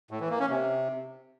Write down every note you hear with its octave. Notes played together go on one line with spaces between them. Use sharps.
A2
E3
A#3
C#4
C3